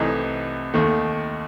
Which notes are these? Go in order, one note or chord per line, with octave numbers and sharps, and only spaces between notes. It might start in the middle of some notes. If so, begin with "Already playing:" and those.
Already playing: C2 C3 E3 A3 D#4
D#2 D#3 A3